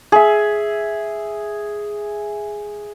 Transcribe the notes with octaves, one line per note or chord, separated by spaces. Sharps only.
G#4 E5